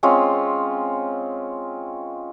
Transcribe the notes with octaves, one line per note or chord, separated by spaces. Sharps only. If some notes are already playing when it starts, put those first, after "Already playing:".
G#3 C4 C#4 F4